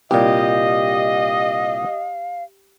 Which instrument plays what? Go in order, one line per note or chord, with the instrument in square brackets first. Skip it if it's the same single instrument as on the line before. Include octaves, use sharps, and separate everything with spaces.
[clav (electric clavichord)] C2 A#2 [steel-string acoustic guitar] G4 [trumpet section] D#5 [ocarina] F5